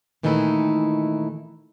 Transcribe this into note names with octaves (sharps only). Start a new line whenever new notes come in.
A#2 D#3 E3 A3 D#4 E4